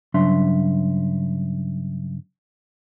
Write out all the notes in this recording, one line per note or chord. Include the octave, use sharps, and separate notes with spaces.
G2 C#3 F#3 D4 E5 C6